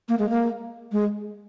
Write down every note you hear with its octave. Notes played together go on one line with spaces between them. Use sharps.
A#3
G#3
A#3
G#3